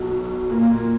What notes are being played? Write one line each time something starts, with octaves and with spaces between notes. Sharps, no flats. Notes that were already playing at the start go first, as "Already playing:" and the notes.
Already playing: B1 B2 F#3
A#2 A#3